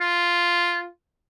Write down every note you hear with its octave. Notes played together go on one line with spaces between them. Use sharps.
F4